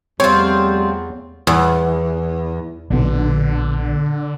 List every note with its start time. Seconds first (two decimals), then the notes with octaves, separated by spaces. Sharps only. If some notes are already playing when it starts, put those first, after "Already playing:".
0.20 E2 F3 G3 A3 C4 F4 C#5
1.47 E2
2.90 A#1 B2 D3